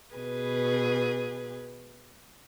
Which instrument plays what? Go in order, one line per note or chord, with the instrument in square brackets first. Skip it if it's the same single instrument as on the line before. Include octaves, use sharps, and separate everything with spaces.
[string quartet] B2 G#4 B4